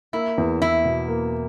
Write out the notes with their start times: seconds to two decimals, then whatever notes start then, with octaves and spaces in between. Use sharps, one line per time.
0.13 A#3 E4
0.38 E2
0.61 E2 E4
0.85 B2
1.08 A#3